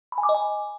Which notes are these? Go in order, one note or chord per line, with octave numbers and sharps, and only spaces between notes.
B5
G#5
D6
D#5
G#5